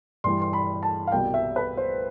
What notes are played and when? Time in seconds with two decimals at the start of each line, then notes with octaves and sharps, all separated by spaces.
0.24 G2 E3 G3 C6
0.42 C6
0.53 B5
0.83 A5
1.07 F5
1.12 C2 B2 G3 G5
1.34 E5
1.56 B4
1.77 C5